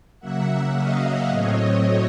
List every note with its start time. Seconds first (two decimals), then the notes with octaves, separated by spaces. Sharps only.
0.19 C#3 F#3 A#3 E5 F#5
0.74 D#5 F5
1.28 A2 F#3 A3 C4 C#5 D#5